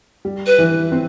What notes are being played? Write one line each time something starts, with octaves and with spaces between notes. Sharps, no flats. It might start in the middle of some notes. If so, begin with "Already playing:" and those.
G3
B4
E3
C4